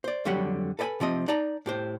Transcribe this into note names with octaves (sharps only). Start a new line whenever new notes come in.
C5 D5
F2 D3 F#3 G3 G4 F#5
A4 B4 D5 G5 G#5 B5
C3 F3 C4 D#5
D#4 D5 A5 A#5
A2 G4 C5